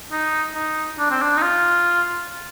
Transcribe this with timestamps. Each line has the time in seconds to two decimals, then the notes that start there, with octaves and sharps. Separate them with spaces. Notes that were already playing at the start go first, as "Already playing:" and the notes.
0.12 D#4
0.55 D#4
0.99 D4
1.11 C4
1.22 D4
1.37 D#4
1.42 F4